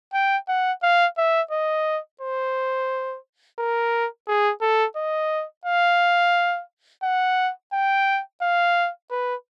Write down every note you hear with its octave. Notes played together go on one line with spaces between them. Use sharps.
G5
F#5
F5
E5
D#5
C5
A#4
G#4
A4
D#5
F5
F#5
G5
F5
B4